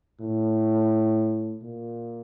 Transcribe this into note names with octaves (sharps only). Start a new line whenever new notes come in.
A2
A#2